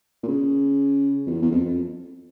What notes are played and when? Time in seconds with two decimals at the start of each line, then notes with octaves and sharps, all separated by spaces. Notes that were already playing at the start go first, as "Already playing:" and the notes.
0.23 A#2
0.27 C#3
1.26 F2
1.30 E2
1.42 E2
1.51 F2
1.65 F2